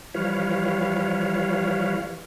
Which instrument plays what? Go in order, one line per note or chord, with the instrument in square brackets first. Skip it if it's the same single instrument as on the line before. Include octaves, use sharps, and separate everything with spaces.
[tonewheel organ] E3 F3 G3 B4 C#5 F5